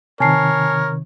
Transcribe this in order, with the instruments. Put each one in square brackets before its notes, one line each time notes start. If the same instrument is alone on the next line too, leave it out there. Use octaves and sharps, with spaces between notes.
[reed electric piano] C3 D#3 [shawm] A#4 [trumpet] C#5 [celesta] G#5 A5 C7